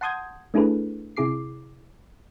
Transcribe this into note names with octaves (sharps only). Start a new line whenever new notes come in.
F#5 A5 C6 D#6 G6 G#6
A3 D4 E4 G#4 A4 B4
C3 E4 G#4 D6 C7